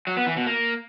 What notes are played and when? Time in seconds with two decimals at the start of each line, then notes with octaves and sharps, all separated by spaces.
0.07 F#3
0.17 B3
0.27 E3
0.36 B2
0.46 A#3